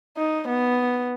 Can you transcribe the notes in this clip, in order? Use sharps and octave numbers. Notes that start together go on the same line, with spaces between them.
D#4
B3